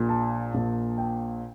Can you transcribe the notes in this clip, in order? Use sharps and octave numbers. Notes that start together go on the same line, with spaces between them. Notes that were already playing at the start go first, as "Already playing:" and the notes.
Already playing: A#1 A#2
A5
A#1 A#2
G5